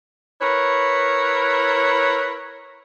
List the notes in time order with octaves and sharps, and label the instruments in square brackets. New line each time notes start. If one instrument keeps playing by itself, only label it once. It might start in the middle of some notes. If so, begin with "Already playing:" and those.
[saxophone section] E4 A#4 B4 C#5